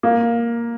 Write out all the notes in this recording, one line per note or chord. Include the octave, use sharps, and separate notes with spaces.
A#3